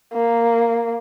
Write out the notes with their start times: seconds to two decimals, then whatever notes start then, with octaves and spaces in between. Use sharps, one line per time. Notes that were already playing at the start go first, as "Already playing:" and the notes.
0.13 A#3